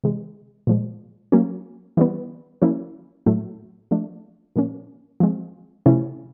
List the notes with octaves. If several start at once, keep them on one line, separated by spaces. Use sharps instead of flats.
C3 E3 G#3
A#2 F3 G#3
F#3 A#3 C#4
E3 G3 B3
F3 A#3 C#4 E4
A2 F#3 A3
F3 A3 D4
A#2 F3 A#3 C#4
F3 G#3 C4
C3 F3 A3 C#4 E4